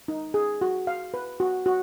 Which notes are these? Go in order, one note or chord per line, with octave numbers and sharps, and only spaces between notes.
D#4
G#4
F#4
F5
B4
F#4
F#4